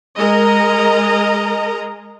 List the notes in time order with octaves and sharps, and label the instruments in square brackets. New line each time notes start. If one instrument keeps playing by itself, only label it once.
[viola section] G#3 A#4 D#5 A#5